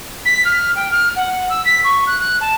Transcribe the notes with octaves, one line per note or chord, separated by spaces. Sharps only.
B6
F6
G5
F6
F#5
E6
B6
C#6
F#6
F#6
A5